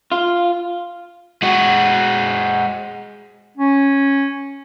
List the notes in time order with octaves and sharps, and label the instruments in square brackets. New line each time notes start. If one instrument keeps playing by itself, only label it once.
[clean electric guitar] F4
[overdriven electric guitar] G#3 F#4
[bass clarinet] C#4